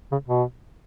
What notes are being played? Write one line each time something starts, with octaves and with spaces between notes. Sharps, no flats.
C#3
B2